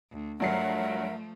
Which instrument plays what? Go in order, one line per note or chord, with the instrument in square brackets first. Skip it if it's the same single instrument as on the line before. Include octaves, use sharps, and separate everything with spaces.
[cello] D2
[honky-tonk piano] G2 F#3 C7 [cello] F3 A3 [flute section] A#4 E5 F#5